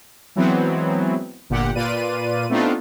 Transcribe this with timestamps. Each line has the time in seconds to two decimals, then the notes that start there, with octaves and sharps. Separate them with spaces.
0.36 E3 F#3 G#3 B3 C4 E4
1.50 G1 A#2 G4 F#5
1.75 A#2 F4 B4 D5 D#7
2.49 A3 B3 C4 D4 D#4 F4